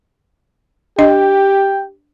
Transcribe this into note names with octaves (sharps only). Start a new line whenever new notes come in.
D4 G4 D#5 G5